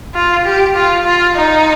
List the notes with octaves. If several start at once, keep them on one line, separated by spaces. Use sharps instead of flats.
F4
G4
F4
F4
D#4